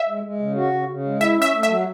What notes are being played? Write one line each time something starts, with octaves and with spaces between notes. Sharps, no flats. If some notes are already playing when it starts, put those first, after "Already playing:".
Already playing: E5
G#3
G#3
C#3
F#4
C#3
C#3
G#3
E4 E5
C#4
E5
A3
F#3 E5